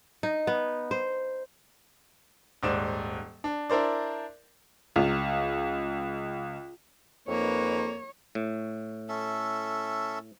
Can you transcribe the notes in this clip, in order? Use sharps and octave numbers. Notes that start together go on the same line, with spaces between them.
D#4
B3
C5
D#1 G#2 D5 E7
D4
D4 E4 A#4 C5 D5
C#2 F4
F2 A#3 D#4 B4 C#5
A2
C#4 A4 E5